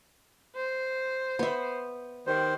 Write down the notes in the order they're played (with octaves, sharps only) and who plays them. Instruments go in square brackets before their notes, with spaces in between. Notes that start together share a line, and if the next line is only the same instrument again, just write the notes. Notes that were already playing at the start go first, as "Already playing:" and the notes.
[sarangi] C5
[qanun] B3 E5
[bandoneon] D#3 C5 [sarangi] G3